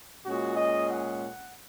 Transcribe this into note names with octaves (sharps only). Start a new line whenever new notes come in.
A#2 G#3 C#4 F#4
D#5
F#5